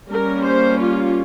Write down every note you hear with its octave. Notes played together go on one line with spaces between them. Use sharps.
G3 A#3 C#4 A#4
C5
F4